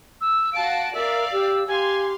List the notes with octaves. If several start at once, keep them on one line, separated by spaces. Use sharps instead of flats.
E6
F#4 F5 A5 D7
A#4 D5 E5 F5
G4 E6
G4 F5 G#5 C6